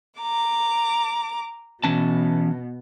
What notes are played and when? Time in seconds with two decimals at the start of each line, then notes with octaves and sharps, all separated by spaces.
0.19 A#5 D6
1.84 B2 E3 C#4 A5